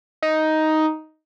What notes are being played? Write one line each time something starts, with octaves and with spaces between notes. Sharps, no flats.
D#4